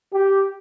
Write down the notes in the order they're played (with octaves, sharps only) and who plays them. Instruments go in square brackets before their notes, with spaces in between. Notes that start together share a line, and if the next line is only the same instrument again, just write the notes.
[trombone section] G4